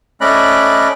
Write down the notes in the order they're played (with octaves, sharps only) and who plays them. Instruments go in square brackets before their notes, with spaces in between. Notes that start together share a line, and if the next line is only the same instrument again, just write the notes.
[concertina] A3 C#4 D5 D#5 B5 F#6